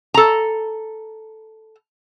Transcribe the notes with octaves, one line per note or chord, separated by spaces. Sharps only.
A4 A#5